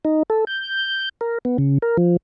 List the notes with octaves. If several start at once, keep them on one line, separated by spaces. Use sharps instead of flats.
D#4
A4
G6
A#4
B3
C#3
A#4
F3